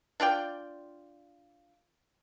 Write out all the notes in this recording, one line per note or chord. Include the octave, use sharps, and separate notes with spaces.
D4 F4 D5 G5